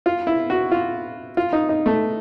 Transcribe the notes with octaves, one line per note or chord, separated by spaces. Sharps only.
F4
E4
F#4
F4
F4
D#4
D#4
A3